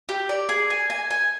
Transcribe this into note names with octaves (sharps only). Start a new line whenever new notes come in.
G4
D5
G#4
G#5
G#5
G#5